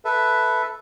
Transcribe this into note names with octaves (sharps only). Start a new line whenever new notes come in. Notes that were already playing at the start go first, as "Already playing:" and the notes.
A4 B4 E5